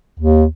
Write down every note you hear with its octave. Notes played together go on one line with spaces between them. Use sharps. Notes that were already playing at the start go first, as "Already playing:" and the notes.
D#2